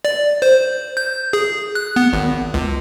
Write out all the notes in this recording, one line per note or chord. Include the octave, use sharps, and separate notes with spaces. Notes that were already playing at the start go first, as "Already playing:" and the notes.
D5
C5
G6
G#4
F#6
B3
G#1
C#2